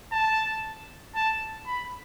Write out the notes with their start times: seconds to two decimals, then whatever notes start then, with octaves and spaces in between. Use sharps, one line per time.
0.12 A5
1.15 A5
1.67 B5